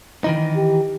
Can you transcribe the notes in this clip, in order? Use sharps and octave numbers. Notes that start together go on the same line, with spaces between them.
D#3 E3 D#4
G4